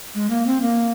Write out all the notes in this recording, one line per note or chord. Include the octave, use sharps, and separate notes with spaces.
G#3
A#3
C4
A#3